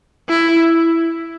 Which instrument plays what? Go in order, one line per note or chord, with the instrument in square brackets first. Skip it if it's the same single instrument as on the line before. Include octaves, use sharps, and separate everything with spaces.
[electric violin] E4